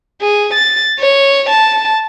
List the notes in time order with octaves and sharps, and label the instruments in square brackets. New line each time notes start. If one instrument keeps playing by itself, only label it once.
[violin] G#4
A6
C#5
A5